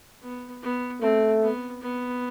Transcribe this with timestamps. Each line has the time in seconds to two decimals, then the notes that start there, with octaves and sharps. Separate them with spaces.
0.22 B3
0.63 B3
1.01 A3 C4
1.42 B3
1.81 B3